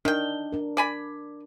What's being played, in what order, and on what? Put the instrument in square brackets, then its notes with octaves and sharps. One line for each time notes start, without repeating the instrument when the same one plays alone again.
[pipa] D#3 G5 [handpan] D4
[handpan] D4 A#4
[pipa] D5 G#5 B5